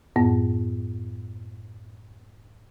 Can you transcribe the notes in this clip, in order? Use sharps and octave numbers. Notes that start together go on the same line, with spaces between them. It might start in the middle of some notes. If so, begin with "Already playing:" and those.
F#2 A2 B3